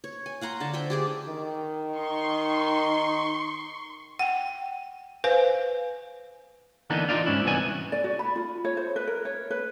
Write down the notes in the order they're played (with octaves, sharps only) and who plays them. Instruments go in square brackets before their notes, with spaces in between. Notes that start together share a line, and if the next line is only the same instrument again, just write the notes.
[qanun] C#5
G#5
F5 F#5 A#5 C6
D3 A5
C5 E5 G5
G4 G#4 D5
[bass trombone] D#3
[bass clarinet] D#4 [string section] C6 C#6
[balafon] F#5 G5
B4 C5 F5 G#5
[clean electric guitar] D3 E3 A#3 B3 D4 D#4
D#4 F4 B4 D5 F5
G#2 C#4 D4 E4
C2 E3 B3 D#4 F#4 G#5
[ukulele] D5
F#4
B5
F4
C#5
C5
B4
A#4
C#5
B4